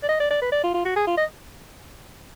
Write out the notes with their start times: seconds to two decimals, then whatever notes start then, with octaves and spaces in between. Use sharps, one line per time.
0.03 D5
0.09 D#5
0.20 D5
0.31 D5
0.41 B4
0.52 D5
0.64 F4
0.74 F4
0.85 F#4
0.96 G#4
1.07 F4
1.17 D#5